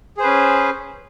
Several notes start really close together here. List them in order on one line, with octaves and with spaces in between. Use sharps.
G#4 C5 B4 C#4